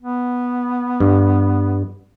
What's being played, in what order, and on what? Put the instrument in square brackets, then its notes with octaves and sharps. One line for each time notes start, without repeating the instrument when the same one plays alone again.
[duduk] B3
[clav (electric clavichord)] G2